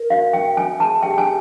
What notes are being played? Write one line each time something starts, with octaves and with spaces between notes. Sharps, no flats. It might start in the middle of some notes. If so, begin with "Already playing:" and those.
Already playing: A#4
F#4 F5
E5 G5
E5 G#5
G#4 A5
G4 G5
G#5
G4